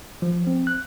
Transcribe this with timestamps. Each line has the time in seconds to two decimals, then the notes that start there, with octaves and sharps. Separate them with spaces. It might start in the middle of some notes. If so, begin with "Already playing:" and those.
0.22 F3
0.47 C4
0.67 F#6